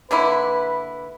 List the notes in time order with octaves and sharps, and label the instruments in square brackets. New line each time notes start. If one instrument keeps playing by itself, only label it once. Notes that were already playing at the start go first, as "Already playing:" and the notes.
[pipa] D3 A#3 E4 [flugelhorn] B4